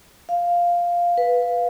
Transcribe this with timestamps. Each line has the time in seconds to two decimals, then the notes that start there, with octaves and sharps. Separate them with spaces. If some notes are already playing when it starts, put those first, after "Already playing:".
0.29 F5
1.18 B4